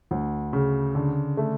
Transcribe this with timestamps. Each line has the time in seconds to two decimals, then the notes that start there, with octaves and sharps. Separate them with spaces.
0.11 D2
0.53 C#3
0.95 D3
1.37 A3